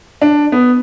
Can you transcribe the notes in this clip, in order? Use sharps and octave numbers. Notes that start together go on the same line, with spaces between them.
D4
B3